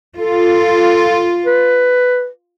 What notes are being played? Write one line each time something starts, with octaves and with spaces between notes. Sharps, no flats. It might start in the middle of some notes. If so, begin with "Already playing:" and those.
F4 A4
B4